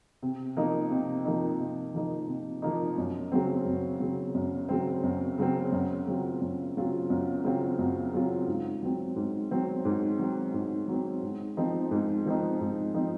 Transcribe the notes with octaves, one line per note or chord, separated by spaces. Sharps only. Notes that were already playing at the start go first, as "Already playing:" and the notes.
C3
F3 A#3 D#4
C3
F3 A#3 D#4
C3
F3 A#3 D#4
C3
F3 A#3 D#4
F#2
C#3 F#3 C4
F#2
C#3 F#3 C4
F#2
C#3 F#3 C4
F#2
C#3 F#3 C4
F#2
C#3 F#3 C4 F4
F#2
C#3 F#3 C4 F4
F#2
C#3 F#3 C4 F4
F#2
C#3 F#3 C4 F4
G#2
F#3 C4
G#2
F#3 C4
G#2
F#3 C4
G#2
F#3 C4
G#2
F3 C4 D#4
G#2
F3 C4 D#4
G#2
F3 C4 D#4